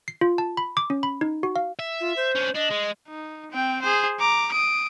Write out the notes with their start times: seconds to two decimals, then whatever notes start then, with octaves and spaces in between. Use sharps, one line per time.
0.08 C7
0.21 F4
0.38 A5
0.57 B5
0.77 D6
0.90 C#4
1.03 B5
1.21 D#4
1.43 F#4
1.56 F5
1.79 E5
2.01 F4
2.17 C5
2.35 C#4 D4
2.55 D4 D#5
2.70 G#3
3.08 D#4
3.51 C4 G5
3.82 G#4 C5
4.20 A#5 D6
4.52 D#6 D7